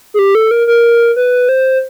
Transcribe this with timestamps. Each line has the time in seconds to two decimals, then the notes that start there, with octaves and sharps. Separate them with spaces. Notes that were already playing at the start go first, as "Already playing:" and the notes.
0.14 G#4
0.19 G4
0.35 A4
0.51 A#4
0.67 A#4
1.16 B4
1.49 C5